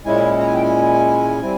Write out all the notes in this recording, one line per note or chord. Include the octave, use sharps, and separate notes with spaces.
A#2 G#3 C#4 E4 G#5
A#5
G#5
G5
G#5
G3 C4 E4